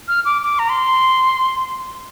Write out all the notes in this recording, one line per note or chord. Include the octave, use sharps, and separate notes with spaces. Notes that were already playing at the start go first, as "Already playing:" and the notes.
F6
D6
D6
A#5
C6